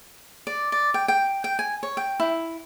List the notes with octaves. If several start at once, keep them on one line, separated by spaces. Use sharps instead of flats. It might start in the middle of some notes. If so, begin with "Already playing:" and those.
D5
D5
G5
G5
G5
G#5
C#5
G5
E4